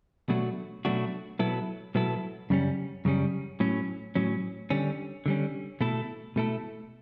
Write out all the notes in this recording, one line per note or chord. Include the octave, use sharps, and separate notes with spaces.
B2 F#3 A3 D4 F#4
B2 F#3 A3 D4 F#4
B2 F#3 B3 E4 A4
B2 F#3 B3 E4 A4
F#2 C#3 G3 C#4
F#2 C#3 G3 C#4
A2 F#3 C#4
A2 F#3 C#4
D3 G3 C#4
D3 G3 C#4
B2 A3 E4 A4
B2 A3 E4 A4